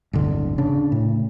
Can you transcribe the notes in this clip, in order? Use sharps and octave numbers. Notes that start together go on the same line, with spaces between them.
D1 G1 D3
C#3 D4
A2